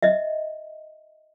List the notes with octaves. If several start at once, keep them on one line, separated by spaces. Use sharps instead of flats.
D#5 E5